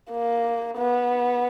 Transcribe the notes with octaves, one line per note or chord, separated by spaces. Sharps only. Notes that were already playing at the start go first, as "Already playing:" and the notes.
A#3
B3